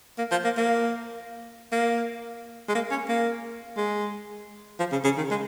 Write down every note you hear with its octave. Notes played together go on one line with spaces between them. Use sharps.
A#3
F3
A#3
A#3
A#3
G#3
A#3
C#4
A#3
G#3
F3
C#3
C#3
D#3
G#3